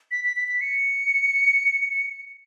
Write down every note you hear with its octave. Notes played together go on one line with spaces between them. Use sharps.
B6
B6
B6
B6
C#7